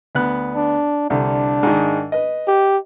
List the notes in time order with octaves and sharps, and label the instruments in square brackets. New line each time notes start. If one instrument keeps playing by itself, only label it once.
[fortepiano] D2 B3 F#6
[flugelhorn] D4
[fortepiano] C2 D3 [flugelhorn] D4
[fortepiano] G#2 D#3
B4 D#5
[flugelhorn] G4